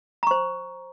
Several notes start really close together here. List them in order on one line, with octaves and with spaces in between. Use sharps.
A#5 C#6 C5